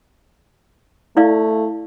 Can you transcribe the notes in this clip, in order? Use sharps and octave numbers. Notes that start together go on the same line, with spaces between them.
A3 E4 D5 F5